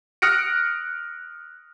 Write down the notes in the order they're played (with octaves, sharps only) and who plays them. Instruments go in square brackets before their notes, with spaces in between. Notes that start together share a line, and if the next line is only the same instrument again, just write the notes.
[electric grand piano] D#6 F6 F#6 A#6 C#7 D7